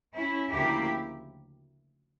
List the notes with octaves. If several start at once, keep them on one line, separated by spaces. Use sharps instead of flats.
C#4 E4
D2 C#3 F3 A#3 E4 G4